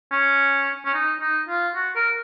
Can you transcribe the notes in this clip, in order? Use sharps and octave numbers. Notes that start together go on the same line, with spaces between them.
C#4
C#4
D#4
D#4
F4
F#4
A#4